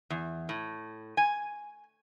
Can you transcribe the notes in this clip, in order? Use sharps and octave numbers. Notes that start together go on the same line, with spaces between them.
E2
A2
G#5